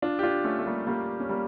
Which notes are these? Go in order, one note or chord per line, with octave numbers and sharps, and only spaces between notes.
D4 F4
G4
D4 F4
A3 C#4
A3
G3 A#3
G3 A#3
C#4
G3 A#3